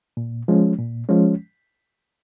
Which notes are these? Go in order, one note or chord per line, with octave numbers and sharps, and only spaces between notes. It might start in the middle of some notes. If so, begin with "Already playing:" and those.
A#2
F3 G#3 C#4
A#2
F3 G#3 C#4